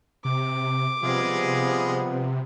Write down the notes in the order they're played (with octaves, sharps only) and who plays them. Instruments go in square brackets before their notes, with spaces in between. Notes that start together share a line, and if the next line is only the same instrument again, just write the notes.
[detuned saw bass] C3 [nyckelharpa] D6
[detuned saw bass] C3 [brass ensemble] F3 G3 B3 [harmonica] G#3 F4 G#4